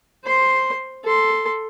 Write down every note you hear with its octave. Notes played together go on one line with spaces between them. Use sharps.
C5 C6
A4 C6